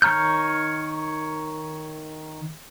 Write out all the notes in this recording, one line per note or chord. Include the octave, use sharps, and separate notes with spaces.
D#3 C#5 A#5 F6 G6